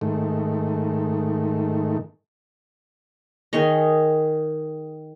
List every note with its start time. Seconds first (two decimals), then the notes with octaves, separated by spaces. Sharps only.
0.01 G#2 D#3 A3
3.53 D#3 G#4 C#5 D#5